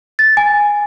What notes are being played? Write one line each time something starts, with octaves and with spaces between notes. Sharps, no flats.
A6
G#5